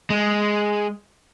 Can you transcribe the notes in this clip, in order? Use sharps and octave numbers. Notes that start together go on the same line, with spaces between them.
G#3